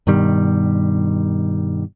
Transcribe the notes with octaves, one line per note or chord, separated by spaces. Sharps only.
G2 B2 D#3 G3